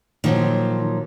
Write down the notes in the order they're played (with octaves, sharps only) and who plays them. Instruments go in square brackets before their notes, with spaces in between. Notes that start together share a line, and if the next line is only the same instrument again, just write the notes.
[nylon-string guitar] A#2 F3 F#3 [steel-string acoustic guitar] D#3